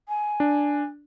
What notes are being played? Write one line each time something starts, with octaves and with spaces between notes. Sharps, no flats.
G#5
D4